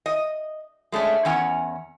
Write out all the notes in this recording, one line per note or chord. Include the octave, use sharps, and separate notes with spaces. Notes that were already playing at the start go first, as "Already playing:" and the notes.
D#5
G#3 A3 C#4 D4
E2 C#4 F#5